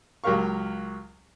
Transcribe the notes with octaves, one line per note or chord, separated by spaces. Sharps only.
C#2 F#3 G4 A#4 F5 C#6